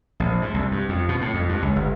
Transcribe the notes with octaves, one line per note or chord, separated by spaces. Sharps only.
A#1
G#2
C2
G2
F2
B2
A2
F2
G2
C#2
G1